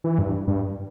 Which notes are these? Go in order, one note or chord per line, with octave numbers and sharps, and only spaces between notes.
E3
G2
G2